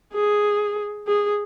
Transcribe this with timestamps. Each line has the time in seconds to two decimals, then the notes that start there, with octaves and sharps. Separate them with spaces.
0.14 G#4
1.07 G#4